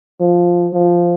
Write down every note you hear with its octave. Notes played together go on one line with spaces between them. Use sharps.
F3
F3